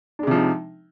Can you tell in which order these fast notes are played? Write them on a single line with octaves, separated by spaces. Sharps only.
D4 G#3 C3 F3 D#4